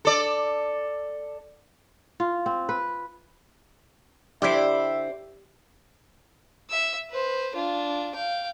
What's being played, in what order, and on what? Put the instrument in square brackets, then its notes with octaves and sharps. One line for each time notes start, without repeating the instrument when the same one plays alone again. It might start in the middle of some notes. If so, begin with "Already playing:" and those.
[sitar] A4 D5
[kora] F4
C4
B4
[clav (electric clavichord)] D3 E4 [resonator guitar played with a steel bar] G4 [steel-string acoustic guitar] C5 D5 [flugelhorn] E5
[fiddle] E5 E6
B4 C5
D4 F4
F5 G5